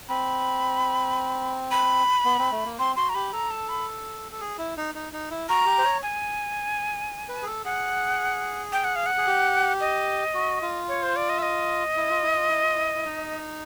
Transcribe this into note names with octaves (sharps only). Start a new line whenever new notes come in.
C4 B5
B5
B3
C4
A3
A#3
C4 C6
F#4 C6
A#5
G4 B5
A4 A#5
A5
B5
A4
G#4
E4
D#4
D#4
D#4
E4
F#4 A#5
G4
C5
C#5
G#5
B4
G#4
A4
G#4 F#5
G5
F#5
F5
F#5
G#4
G4
D#5
F#4
F4
C#5
C5
D5
D#5
E5
D#5
E4
F4
E4
F4
E4
F4
E4
E4
D#4